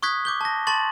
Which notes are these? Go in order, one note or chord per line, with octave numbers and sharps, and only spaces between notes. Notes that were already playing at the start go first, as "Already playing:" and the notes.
C#6 D#6 F#6 G#6 B6
D6 G6 G7
A5 A#6
A5 C6 C#6 A6 F#7